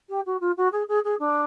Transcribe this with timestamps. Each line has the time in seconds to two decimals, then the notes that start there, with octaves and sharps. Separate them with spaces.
0.09 G4
0.25 F#4
0.40 F4
0.57 F#4
0.72 G#4
0.88 G#4
1.04 G#4
1.19 D4